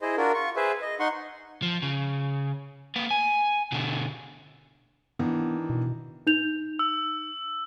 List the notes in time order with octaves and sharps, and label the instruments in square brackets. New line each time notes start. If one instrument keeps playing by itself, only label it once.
[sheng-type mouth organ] E4 G#4 C5 D#5
D4 F4 F#4 A#4
F4 C#6
G#4 B4 C5 E5
D#5
D#4 F#5 C6 C#6
[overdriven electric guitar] F3
C#3
A#3 B4
G#5
B2 D3
[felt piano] D#3 E3 D4 [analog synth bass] B3
[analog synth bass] B2
[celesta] D#4 G6 F7
[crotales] E6